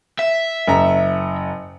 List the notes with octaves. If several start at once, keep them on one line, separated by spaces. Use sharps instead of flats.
E5
F#1 A#5